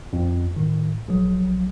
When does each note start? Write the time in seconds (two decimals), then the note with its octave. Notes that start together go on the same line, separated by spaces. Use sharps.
0.13 F2
0.56 A2 D#3
1.08 A#1 F#3